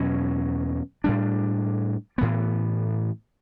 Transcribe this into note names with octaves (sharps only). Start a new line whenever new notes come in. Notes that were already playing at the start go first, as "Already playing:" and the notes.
Already playing: E2 B2 F#3 C#4
A2 G3 D4
A2 E3 B3